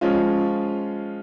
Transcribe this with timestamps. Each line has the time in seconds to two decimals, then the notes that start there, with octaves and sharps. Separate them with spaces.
0.01 F3 G#3 C#4 F4